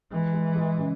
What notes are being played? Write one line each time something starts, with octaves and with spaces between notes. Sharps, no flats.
E3 G#3
G#3
G#3
C#3